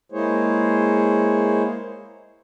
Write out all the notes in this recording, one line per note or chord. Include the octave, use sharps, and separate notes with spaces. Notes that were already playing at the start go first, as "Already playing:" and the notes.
G#3 A#3 E4 G#4 C5 C#5